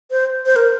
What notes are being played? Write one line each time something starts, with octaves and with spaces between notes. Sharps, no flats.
C5
C5
A#4